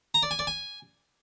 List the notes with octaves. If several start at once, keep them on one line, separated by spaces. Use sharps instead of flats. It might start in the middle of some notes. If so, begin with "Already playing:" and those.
A#5
D5
G#5
D5
G#5